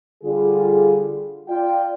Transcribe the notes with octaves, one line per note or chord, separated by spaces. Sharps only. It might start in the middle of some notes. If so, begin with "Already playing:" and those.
D3 G3 F4 G#4
F4 D5 G5